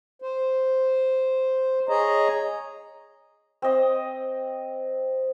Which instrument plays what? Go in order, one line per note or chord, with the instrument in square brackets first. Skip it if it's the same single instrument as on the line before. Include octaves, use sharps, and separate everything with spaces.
[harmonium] C5
G#4 C#5 D#5 A#5
[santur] C4 D#5